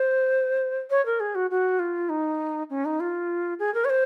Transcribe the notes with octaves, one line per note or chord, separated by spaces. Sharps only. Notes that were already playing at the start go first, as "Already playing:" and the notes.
Already playing: C5
C#5
A#4
G#4
F#4
F#4
F4
D#4
C#4
D#4
F4
G#4
A#4
C#5
C5